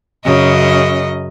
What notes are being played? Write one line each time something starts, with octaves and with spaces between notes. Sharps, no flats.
F#2 C#3 D#5